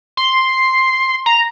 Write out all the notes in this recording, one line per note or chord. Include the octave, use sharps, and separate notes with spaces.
C6
A#5